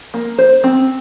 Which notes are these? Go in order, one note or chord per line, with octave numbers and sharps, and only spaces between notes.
A#3
C5
C4